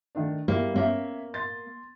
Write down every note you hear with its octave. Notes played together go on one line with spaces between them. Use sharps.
D#3 A3 D4
G3 A#3 E4
A#3 C#4 C#5 E5
C6 A6